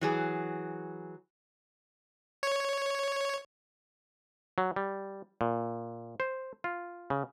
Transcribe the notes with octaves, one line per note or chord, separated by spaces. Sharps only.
E3 F#3 G#4
C#5
F#3
G3
A#2
C5
F4
C#3